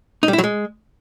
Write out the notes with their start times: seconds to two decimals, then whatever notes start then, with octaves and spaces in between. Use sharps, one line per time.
0.23 D#4
0.28 G3
0.33 E4
0.38 F#3
0.44 G#3